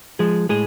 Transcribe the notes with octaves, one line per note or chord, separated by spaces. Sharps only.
F3 G#3 G#4
A2 G#3 G#4